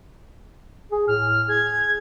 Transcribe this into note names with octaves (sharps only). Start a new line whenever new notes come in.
G#4
A2 F6
G#4 G#6